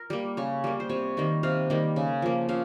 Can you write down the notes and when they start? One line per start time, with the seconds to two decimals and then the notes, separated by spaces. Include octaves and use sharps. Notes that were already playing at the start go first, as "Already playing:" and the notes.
Already playing: A#4
0.10 G3 A#3
0.37 C#3 C#5
0.64 G3 A#3
0.80 C5
0.90 C3 C#5
1.17 D#3 G3 A#3
1.43 C3 F5
1.70 D#3 G3 A#3
1.96 C#3
2.22 F3 A#3
2.49 C#3 F5